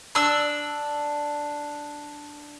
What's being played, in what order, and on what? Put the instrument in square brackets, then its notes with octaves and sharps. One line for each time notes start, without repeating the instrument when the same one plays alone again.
[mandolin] D4 E6